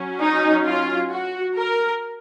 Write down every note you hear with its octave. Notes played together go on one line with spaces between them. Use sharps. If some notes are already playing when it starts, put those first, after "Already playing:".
Already playing: F#3 C#4
D#4
F4
F#4
A#4